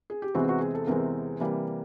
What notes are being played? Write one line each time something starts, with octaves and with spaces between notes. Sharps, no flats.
G#4
G4
E2 C3 E3 G#3 C4 F#4
F#4
G#4
A4
E2 C3 E3 G#3 C4 A#4
C3 E3 G3 A#3